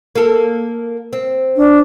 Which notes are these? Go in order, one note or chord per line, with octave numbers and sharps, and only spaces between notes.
A#3 A4
C4
D4